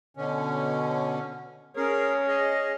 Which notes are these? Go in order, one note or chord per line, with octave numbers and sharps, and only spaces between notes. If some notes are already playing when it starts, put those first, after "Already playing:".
B2 D3 C#4
C#4 G#4 A#4
G#4 D#5